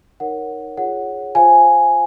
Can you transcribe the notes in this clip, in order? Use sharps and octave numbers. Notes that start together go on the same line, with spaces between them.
D#4 A#4 C#5 F#5
F4 G#4 C#5 F#5
F4 C5 F5 G#5